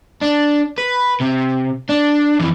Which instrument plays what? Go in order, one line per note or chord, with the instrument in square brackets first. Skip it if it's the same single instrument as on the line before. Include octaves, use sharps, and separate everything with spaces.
[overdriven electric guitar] D4
B4
C3
D4
F2 E3